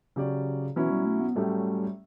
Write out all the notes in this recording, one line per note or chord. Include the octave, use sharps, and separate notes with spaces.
C#3 F#3 C#4 G4 D5
B2 E3 F#3 C#4 E4
G3
A3
B3
A2 F#3 G3 A3 C#4 G4